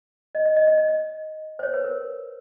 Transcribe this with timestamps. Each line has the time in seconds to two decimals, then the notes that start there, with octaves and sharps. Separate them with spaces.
0.35 D#5
0.45 D#5
0.56 D#5
0.67 D#5
0.78 D#5
0.88 D#5
1.59 C5
1.63 C#5
1.74 B4
1.85 A#4